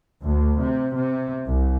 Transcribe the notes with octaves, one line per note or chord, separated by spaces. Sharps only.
D2
C3
C3
C2